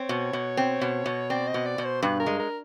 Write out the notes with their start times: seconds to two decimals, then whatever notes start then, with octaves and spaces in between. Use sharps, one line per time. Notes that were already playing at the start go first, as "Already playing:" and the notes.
Already playing: C4 C#5
0.09 B2
0.33 B2
0.57 C4
0.81 B2
1.06 B2
1.30 C4 D5
1.47 D#5
1.54 B2
1.66 D5
1.78 B2
1.85 C5
2.03 G2 B4
2.20 A#4
2.26 G#3
2.39 A#4